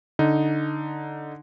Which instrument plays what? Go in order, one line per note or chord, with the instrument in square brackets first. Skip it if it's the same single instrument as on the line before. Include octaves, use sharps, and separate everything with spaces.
[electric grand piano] D3 D#4